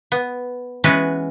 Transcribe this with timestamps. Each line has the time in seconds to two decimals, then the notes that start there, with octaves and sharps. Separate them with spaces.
0.12 B3
0.84 E3 G#3 B3 C#4 F#4 B4